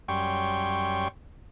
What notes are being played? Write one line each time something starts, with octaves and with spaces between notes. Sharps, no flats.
F#2 G3 C#5 G5 C6 C#6